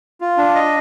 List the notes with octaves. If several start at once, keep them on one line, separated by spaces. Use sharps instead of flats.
F4
D4
D#5